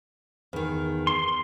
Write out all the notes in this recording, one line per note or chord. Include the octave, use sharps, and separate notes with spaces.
E2 D#3
C6